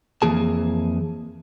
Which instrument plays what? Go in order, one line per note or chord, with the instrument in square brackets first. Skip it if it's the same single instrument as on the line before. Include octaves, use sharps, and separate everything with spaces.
[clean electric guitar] F2 E3 A#3 G#4 A5